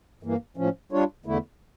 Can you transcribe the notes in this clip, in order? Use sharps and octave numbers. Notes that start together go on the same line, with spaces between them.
G2 E3 A#3
A2 F3 C#4
G3 D4 F4 C#5
E2 D3 A3 E4